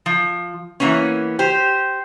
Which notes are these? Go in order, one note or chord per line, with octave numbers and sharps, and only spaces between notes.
F3
E3 F#3 A#3 B3 C#4
G4 C5